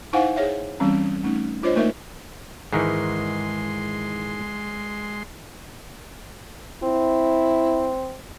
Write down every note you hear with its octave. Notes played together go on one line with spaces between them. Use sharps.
D#4 E4 C5 F5 F#5 G#5
G#4 C#5 E5
E3 G3 C4 C#4
A3 C#4 D#4
D4 F4 C5 C#5 D#5
A3 A#3 D#4 A#4 B4 E5
G#2 D#3 E3 G#3 C6
C4 E4